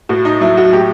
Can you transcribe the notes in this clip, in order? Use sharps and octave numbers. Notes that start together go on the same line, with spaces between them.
A2 F#4
D#4
F#3 E4
F#4
A2 G4